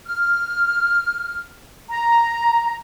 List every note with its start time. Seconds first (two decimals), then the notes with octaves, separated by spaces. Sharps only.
0.06 F6
1.90 A#5